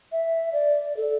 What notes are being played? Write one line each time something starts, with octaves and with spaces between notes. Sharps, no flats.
E5
D5
A4